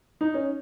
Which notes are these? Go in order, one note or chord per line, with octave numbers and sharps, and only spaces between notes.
D#4
C#4